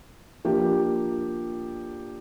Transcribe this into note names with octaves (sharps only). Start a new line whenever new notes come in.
F3 A#3 D4 G4